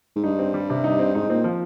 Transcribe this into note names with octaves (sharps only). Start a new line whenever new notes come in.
G#2
G2 D#4
C4
G3
C3
D#4
C4
G#2 D#4
A#2 C4
F3